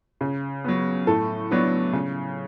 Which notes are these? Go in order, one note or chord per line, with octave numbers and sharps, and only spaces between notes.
C#3
F#3 B3
A2 A4
F#3 B3 D4
C#3